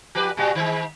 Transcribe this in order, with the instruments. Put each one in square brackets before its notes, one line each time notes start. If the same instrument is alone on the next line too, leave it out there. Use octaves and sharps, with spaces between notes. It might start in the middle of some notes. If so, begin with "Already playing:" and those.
[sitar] F3 G4 B4
A#2 G3 F#4
D#3 G#3